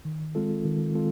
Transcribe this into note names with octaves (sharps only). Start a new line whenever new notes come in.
D#3
G#3 C4 F4 A4
D#3
G#3 C4 F4 A4